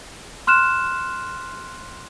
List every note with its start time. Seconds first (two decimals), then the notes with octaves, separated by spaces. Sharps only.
0.47 C6 F6 F#6 E7